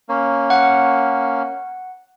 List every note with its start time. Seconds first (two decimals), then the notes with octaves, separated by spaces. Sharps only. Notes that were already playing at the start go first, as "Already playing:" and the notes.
0.09 A#3 C#4
0.50 F#5